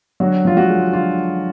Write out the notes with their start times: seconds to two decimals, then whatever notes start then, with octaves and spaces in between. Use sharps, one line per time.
0.20 D3 F#3 F#4
0.45 F3 F4
0.57 F#3 F#4
0.69 G#3
0.93 D3 F4